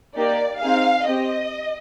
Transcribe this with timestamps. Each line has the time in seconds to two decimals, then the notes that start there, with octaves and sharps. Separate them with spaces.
0.16 A#3 D#4 G4 D5
0.61 C4 D#4 G#4 F5
1.07 C4 G4 D#5